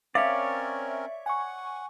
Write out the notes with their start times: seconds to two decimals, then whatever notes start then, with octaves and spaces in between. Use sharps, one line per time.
0.15 C4 C#4 A#4 C#5 D5 E5 F5
1.26 F#5 G#5 C#6